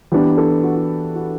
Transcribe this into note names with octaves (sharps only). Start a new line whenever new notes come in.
E3 B3 D4 G4
A4
F#4
F#4
F#4